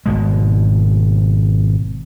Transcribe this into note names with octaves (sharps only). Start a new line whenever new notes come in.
G#1 B2 G#3